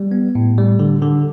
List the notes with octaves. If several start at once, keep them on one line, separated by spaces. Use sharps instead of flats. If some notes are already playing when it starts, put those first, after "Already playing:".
Already playing: G3
B3
A2
G3
D3
D3